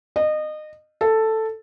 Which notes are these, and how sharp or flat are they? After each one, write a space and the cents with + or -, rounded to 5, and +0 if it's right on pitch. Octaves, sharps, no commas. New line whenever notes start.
D#5 -25
A4 +5